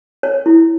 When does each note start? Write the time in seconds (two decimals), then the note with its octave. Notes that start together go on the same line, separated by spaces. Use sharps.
0.23 C#5
0.46 E4